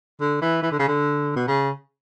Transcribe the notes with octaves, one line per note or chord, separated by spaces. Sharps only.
D3
E3
E3
D3
C#3
D3
B2
C#3